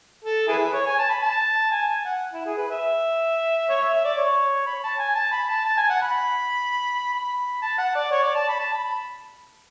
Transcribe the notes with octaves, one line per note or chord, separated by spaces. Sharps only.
A4
E4 G#4 B4
C#5
G#5
A5
B5
A5
G#5
G#5
F#5
E4
G#4
B4
E5
C#5
E5
E5
D5
C#5
B5
A5
G#5
A5
B5
A5
A5
G#5
F#5
B5
B5
A5
F#5
D5
C#5
D5
A5
B5
A5
B5
B5